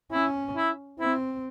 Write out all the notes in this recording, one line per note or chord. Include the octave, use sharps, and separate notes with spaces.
C#4 E4
E4
C4 E4